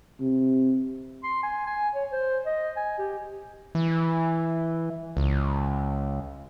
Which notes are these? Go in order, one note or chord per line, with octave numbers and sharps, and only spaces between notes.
C3
C6
G#5
G#5
C#5
C5
D#5
G#5
G4
E3
C#2